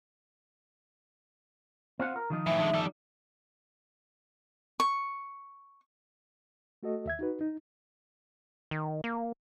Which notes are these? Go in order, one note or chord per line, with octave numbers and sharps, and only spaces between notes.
C4 F4 F#5
A#4
D#3 F3 D#4
A2 E3 E5
D3 G#3
G3 A4
C#6
A3 F#4 A4 D#5
D#2 E5 G#6
D#4 F#4 B4
D#4
D#3
A#3